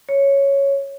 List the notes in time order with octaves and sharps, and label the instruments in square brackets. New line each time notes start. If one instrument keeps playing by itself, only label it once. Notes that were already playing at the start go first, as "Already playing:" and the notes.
[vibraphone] C#5